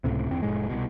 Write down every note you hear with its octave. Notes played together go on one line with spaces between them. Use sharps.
C#2 A2 C3
G1 E2 C4
F1 A2 G#3
C2 B2